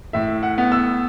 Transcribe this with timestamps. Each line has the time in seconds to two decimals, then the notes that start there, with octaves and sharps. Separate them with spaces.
0.13 A2 E5
0.43 F#5
0.58 B3
0.72 E6